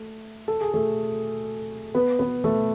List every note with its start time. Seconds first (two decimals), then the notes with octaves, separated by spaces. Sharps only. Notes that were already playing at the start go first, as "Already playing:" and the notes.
Already playing: A3
0.48 A4
0.61 G#4
0.74 A3 A4
1.95 B3 B4
2.19 B3 B4
2.44 A3 A4